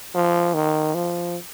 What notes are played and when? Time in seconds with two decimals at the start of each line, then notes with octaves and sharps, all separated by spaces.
0.15 F3
0.54 D#3
0.95 F3